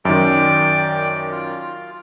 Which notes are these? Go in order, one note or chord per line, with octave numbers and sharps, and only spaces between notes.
F#2 D#3 D5 G5
F4